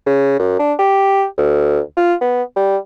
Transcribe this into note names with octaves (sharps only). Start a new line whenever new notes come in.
C#3
F#2
D4
G4
D2
F4
B3
G3